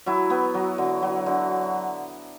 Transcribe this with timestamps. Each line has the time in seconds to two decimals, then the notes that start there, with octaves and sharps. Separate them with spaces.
0.06 F#3 E4
0.30 B3
0.54 F#3
0.78 D3
1.02 F#3
1.26 D3